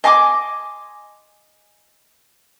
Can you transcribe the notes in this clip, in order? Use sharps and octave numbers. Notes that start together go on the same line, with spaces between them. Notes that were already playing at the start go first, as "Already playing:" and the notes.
D#5 G#5 C6 D6